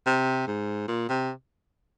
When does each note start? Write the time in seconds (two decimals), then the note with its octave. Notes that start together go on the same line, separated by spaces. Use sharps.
0.07 C3
0.47 G#2
0.88 A#2
1.09 C3